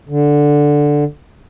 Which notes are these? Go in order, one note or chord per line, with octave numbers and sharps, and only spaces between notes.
D3